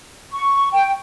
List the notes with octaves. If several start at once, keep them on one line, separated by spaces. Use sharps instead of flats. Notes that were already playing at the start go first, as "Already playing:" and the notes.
C#6
G5